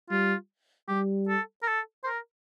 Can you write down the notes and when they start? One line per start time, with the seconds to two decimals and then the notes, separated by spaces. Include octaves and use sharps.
0.10 G3 F4
0.88 G3 G4
1.29 A4
1.63 A#4
1.68 A4
2.03 C5
2.07 A#4